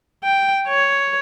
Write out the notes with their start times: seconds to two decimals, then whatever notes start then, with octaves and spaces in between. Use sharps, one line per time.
0.23 G5
0.68 C#5